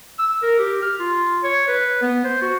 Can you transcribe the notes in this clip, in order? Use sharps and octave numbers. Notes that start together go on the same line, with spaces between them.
E6
A#4
G4
F6
F4
C#5
B4
B3
C5
F#4